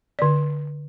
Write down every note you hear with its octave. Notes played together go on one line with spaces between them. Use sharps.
D3 D5